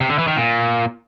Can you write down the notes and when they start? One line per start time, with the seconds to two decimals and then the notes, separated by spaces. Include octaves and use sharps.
0.01 C3
0.10 D3
0.18 E3
0.27 D#3
0.36 A#2